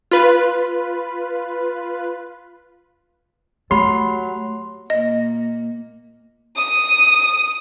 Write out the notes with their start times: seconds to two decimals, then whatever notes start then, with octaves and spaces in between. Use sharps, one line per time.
0.11 F4 B4
3.71 F#3 A3 G4 B5 C6
4.90 A#2 A#3 D#5
6.57 D#6